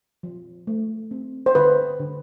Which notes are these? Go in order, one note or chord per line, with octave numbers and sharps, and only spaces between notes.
F3
A3
C4
C5
D3 B4
D3